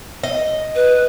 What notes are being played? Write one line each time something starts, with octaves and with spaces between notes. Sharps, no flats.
D#5
B4